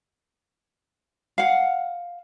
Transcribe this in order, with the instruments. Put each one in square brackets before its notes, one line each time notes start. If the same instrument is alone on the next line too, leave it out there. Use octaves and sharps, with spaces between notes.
[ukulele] F5 F#5